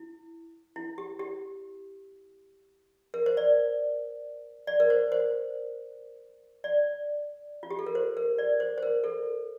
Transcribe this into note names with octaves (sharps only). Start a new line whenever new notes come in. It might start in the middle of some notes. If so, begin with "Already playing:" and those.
Already playing: E4
E4
G4
G4
A#4
C5
D5
D5
A#4
C5
C5
D5
F4
G4
A4
A#4
C5
A#4
D5
C5
C5
A#4
A4